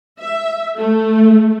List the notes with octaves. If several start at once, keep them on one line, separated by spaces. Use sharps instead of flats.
E5
A3